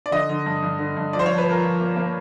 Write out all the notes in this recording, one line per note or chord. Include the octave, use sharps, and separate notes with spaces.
D5
D3 D#5
D3
G2
G2
D3
G2
F3 D5
C5
F3 C#5
B4
F3 A#4
F3
A#3
A#3